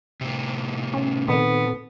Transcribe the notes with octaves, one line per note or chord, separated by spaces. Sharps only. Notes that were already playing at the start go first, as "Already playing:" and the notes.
A2 C3
C#4
A#2 D#3 B3 C4 A4